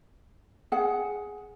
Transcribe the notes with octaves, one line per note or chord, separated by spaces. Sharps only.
G#4 F#5